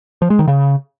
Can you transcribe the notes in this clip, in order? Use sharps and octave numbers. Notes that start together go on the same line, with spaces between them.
F3
G#3
D#3
C#3